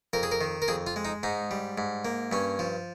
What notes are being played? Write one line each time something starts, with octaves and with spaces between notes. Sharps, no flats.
F2 A#4
G#4
A#4
D#3
A#4
F2 G#4
F4
G#3
D#4
G#2 D#4
G3
G#2
A#3
G2 C#4
F3